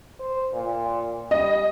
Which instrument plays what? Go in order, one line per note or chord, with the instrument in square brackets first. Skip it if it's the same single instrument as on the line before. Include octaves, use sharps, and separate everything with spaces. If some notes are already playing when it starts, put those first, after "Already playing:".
[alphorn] C5
A#2
[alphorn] G3 [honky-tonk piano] D#5